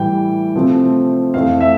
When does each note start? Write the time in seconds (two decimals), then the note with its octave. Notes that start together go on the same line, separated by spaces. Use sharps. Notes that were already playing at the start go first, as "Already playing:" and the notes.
Already playing: A2 E3 G3 G5
0.55 C3 F3 A3 C4
1.34 F2 E3 A3 C4 F5
1.60 E5